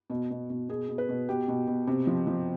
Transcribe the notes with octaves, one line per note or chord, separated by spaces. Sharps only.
B2
B2
B2
B2 G#4
B2
B4
B2
B2 G4
B2
B2
C3
F3
F3